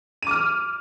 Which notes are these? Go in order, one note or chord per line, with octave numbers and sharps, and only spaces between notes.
D6 F6 D#7